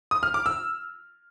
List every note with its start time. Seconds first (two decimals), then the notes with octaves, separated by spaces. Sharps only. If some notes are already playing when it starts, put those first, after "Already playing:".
0.11 D#6
0.23 F6
0.34 D6
0.46 E6